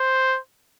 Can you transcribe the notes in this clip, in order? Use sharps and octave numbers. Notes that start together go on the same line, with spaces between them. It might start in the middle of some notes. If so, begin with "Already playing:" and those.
Already playing: C5